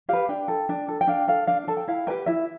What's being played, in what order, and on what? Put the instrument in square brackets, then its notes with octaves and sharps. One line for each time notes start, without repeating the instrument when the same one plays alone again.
[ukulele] G4 B4 F5
D4 G5
A4
D4
A4
G5
D4 F5
A4 F5
D4 F5
A4 A5
G5
E4 F5
G4 B4 G5
E4 E5